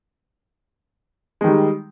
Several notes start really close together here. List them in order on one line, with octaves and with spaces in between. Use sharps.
G#3 D#3 G3